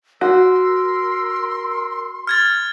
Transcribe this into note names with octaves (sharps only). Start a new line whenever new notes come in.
F#4 A#4 C6 E6
F6 G#6 A6